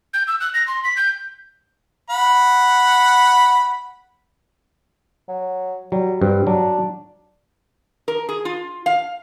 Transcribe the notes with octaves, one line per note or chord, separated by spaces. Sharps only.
G6
E6
F#6
A#6
C6
B6
G6
F#5 B5
F#3
F#3 G3
G2 C4
F#3 D4
A#4
G#4
F4
F5